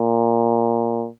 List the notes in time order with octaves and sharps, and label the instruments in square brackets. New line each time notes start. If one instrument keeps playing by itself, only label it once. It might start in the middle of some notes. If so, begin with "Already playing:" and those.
Already playing: [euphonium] A#2